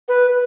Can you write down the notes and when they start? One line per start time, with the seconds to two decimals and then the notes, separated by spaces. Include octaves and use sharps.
0.08 B4